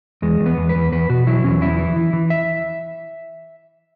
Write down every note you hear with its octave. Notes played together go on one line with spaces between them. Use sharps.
E2 G#3
E2
B3
E2
B4
E2
E2 B4
B2 F#4
F#3 E4
E2 C#4
E3 E4
E3
E3
E3
E5